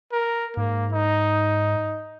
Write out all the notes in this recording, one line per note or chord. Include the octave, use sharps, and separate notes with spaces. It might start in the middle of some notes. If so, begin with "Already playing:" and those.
A#4
G#2 A#3
D#4